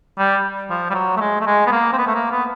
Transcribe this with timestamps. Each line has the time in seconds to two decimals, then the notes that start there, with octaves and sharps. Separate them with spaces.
0.18 G3
0.70 F3
0.90 G3
0.95 F#3
1.17 A3
1.21 G#3
1.41 A3
1.46 G#3
1.66 B3
1.72 A#3
1.93 C4
1.98 B3
2.07 A3
2.15 A#3
2.32 B3